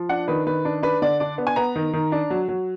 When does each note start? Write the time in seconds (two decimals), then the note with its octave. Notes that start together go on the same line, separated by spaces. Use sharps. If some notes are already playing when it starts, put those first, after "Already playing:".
Already playing: F3
0.09 D4 F#5
0.28 D#3 B4
0.46 D#3 B4
0.65 D4
0.83 D4 B4
1.02 D3 D5
1.20 D4 D5
1.38 B3
1.47 G#5
1.56 B3 A#5
1.76 D#3
1.93 D#3
2.12 D4
2.30 F#3
2.49 F#3